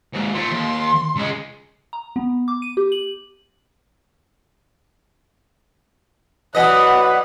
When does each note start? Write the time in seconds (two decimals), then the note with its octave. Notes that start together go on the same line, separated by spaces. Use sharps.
0.13 D#2 G#2
0.34 A#2 A3 C6
0.51 D#2
1.16 C#2 G#3
1.93 A#5
2.16 B3
2.48 D6
2.62 D#7
2.77 G4
2.92 F#7
6.55 E3 F#3 B4 D5 D#5 F#5